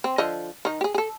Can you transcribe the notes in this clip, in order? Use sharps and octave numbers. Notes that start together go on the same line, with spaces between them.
C4
D3 F3 D#5
D#3 D#4
G4 G#4
G#4 A4